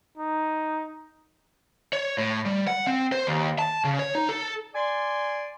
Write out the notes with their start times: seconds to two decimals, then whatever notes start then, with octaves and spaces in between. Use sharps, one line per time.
0.18 D#4
1.93 C#5
2.18 A2
2.46 G3
2.67 F#5
2.87 C4
3.12 C5
3.27 D#2
3.59 A5
3.84 C#3
3.99 C#5
4.15 D#4
4.29 A4
4.74 D5 G#5 C6